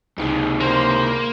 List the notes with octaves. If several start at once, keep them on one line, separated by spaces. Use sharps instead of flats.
C#2 C3 D#4 G#4
A#3 C5